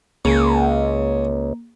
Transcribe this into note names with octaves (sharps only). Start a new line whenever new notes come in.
C#2 C#3 A#3